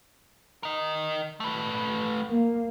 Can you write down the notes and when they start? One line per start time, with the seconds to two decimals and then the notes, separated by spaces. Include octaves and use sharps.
0.63 A#4 D#5
1.40 A3 B4
2.31 A#3